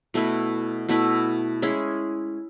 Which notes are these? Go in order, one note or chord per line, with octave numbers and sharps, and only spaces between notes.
B2 A3 E4 B4
B2 A3 E4 B4
G#3 C#4 E4 G#4